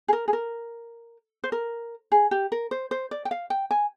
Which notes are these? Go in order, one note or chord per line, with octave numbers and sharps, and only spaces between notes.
G#4
A#4
G#4
A#4
C5
A#4
G#4
G4
A#4
C5
C5
D5
G5
F5
G5
G#5